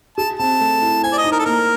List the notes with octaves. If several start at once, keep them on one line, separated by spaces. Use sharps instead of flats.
G#4 A5
C4 A5
A3
E4
C5 G#5
D5
D#5
D#4
A#4
A4
A#3 A#4